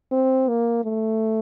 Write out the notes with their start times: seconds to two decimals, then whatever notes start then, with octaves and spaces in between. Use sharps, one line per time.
0.12 C4
0.48 A#3
0.84 A3